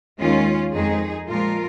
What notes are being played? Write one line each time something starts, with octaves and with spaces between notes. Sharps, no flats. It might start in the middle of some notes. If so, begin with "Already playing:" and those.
D#2 D#3 G#3 C#4 F4
F2 D#3 G#3 D#4 G#4
A#2 F3 G#3 F4 A#4